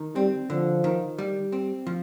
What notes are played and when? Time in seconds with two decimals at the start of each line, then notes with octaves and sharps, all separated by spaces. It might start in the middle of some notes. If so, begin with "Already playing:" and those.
Already playing: D#3
0.15 G3 C4
0.49 D3 F3
0.84 D#3
1.18 G3
1.52 C4
1.87 F3